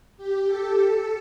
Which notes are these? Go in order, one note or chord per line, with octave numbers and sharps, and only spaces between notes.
G4
A4
A4